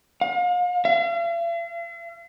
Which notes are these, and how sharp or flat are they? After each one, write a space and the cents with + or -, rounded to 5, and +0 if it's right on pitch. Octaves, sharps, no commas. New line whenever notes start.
F5 +40
F5 -45